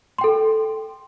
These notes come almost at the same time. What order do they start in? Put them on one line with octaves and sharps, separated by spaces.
C6 G5 A4